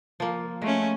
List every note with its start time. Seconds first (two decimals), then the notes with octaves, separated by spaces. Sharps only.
0.20 F3 A#3
0.62 G#3 A3 C#4